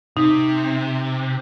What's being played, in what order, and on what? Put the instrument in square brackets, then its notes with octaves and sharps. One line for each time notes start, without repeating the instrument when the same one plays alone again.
[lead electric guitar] C3 [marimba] D#4